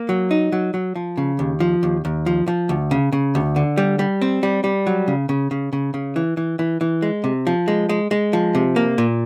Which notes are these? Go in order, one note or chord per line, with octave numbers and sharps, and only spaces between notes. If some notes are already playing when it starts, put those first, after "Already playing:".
Already playing: A#3
F#3
D#4
F#3
F#3
F3
C#3
D#2
F3
D#2
D#2
F3
F3
D2
C#3
C#3
D2
D3
G3
G3
C4
G3
G3
F#3
C#3
C#3
C#3
C#3
C#3
E3
E3
E3
E3
G#3
C3
F3
G#3
G#3
G#3
F3
C3
A#3
A#2